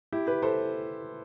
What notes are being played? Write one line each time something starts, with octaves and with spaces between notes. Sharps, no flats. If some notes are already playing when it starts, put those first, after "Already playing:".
E4 G4
G4 B4
A4 C5